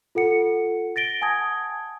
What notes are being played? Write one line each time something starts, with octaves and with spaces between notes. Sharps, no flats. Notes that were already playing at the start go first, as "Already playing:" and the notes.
F4 A4 F#5 C#7
A6 A#6 D7 G7
F#5 G#5 A5 D#6 G#6